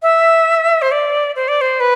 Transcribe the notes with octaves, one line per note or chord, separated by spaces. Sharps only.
E5
C5
D5
C5
D5
C5
B4